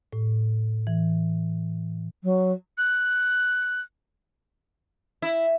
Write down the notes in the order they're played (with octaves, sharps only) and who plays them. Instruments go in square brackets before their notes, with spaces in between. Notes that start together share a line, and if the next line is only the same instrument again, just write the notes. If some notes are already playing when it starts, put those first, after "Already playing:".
[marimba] A2
E3
[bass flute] F#3
[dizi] F#6
[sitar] E4